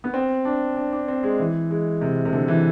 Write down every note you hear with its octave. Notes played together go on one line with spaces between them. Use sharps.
B3
C4
D4
D4
D4
C4
G#3
E3
G#3
C3
C3
D3
E3